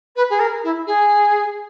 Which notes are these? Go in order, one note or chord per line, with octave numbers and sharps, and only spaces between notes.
B4
G#4
A#4
E4
G#4